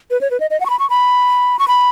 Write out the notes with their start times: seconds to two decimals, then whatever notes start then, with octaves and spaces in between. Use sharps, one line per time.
0.11 B4
0.21 C#5
0.31 B4
0.40 D#5
0.50 D#5
0.60 F#5
0.66 C#6
0.70 B5
0.79 C#6
0.90 B5
1.59 C#6
1.68 B5